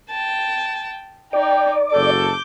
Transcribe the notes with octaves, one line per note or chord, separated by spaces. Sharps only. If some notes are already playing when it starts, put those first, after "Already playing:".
G5 A5
D#4 D5 G5
F#1 F#4 A4 D6 G6